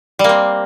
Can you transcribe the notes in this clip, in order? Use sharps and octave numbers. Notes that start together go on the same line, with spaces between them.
G3 A#3 C4